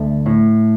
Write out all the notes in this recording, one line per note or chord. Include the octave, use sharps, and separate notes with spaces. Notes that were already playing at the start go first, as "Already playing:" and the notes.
Already playing: D2 A3
A2